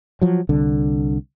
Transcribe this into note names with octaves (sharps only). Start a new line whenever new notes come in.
F3 F#3
C2 D3